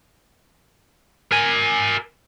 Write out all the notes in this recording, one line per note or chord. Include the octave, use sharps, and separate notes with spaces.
A#4 G#5